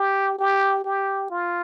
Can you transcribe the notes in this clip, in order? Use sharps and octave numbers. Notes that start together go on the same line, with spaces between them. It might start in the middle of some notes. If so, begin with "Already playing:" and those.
Already playing: G4
G4
G4
F4